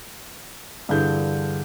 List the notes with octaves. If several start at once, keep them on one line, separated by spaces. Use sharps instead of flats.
G2 D3 E3 G#4 G6